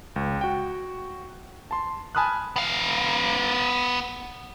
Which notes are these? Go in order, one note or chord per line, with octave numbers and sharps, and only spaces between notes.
C#2
F#4 G5
A5 C6
G#5 A5 B5 D#6 F6 F#6
B3 F5